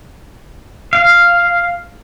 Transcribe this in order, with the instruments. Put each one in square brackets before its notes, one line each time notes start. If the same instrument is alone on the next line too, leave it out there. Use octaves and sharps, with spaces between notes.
[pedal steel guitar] F5